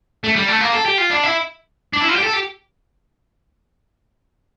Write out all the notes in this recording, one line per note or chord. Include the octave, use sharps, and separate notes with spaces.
A3
G3
A3
A#3
A4
G4
F4
D4
E4
D4
E4
F4
G4
A4
G4